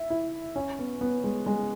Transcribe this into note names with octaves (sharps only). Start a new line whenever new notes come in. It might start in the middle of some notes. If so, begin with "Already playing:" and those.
Already playing: E4
E4
C#4
B3
B3
G#3
G#3